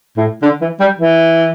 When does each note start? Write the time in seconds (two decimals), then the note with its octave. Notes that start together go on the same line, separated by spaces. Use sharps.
0.17 A2
0.42 D3
0.61 E3
0.80 G3
0.99 E3